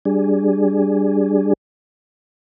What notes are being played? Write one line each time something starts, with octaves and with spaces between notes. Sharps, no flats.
G3 D4 G#4